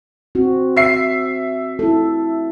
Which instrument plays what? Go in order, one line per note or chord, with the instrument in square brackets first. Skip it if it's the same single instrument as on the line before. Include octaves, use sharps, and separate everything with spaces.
[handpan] C4 F#4
[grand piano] E5 C7
[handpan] E4 A4